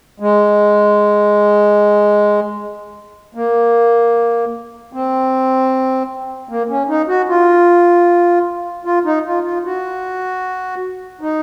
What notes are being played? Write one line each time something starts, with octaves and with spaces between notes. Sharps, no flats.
G#3
A#3
C4
A#3
C#4
D#4
F#4
F4
F4
D#4
F4
F4
F#4
D#4